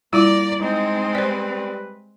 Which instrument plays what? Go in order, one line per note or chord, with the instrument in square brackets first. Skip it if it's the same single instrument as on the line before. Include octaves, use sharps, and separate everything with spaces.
[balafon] G3 F4 [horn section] A#3 A#5 [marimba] E4 [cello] D5
[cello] G#3 C4 [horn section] D#4
[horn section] G3 B4 [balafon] C5 D5